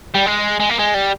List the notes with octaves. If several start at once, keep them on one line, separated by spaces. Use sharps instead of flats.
G3
G#3
G#3
A#3
G#3
G3